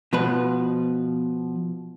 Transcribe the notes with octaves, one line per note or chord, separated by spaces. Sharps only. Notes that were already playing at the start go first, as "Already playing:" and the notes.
B2 F3 B4